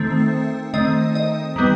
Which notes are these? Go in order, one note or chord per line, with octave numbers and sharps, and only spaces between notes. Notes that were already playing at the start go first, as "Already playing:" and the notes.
Already playing: D#3 A3 C4
D#3 A3 C4 D#5
D#5
D#3 G3 B3